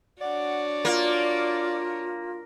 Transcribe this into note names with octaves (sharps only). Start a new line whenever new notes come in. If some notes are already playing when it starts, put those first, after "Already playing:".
D4 F#4 C#5 D5 F#5
A#3 F4